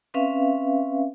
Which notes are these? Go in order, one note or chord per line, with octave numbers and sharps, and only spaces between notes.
C4 C#4 B4 E5 F5